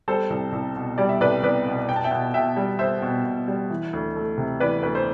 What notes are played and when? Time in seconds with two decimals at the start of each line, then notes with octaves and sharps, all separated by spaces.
0.08 G3 A4 C5
0.30 C2
0.52 C2
0.76 B2
0.98 G3 D5
1.09 E5
1.21 C2 B4 D5
1.43 C2 B4 D5
1.66 B2
1.88 B3 G5
1.96 A5
2.04 E5 G5
2.11 B2
2.34 B2 E5 G5
2.57 G3
2.79 B3 C5 E5
3.02 B2
3.24 B2
3.48 G3
3.70 E3
3.93 D2
4.16 A3
4.38 C3
4.60 E3 B4 D5
4.83 D2 B4
4.95 C5